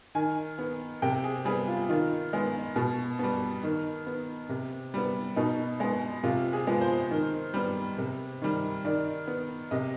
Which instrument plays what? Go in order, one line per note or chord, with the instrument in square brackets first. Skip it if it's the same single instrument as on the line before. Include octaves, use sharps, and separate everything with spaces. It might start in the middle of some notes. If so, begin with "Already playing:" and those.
[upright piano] D#3 G#5
B3
C3 G5
G#4
G3 B3 G#4
F4
D#3 F4
G#3 B3
B2
G3 B3
D#3
B3
C3
G3 B3
B2 D#4
G#3 B3
C3 F4
G#4
F3 G#3 B3
C5
D#3
G3 B3
C3
D#3 G3
D#3 D5
B3
C3 D#5